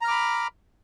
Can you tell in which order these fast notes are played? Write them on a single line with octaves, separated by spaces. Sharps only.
A#5 F6 D6 B5